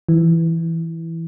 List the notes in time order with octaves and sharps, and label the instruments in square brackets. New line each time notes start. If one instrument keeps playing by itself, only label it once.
[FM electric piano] E3